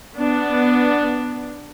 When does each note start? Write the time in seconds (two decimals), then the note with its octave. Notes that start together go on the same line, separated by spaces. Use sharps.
0.18 B3 D4